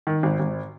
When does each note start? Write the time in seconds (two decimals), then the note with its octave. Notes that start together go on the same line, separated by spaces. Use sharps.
0.07 D#3
0.23 G#1
0.40 G#1